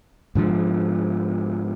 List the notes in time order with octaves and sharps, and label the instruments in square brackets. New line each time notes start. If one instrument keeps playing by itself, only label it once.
[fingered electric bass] G#2 D3 F3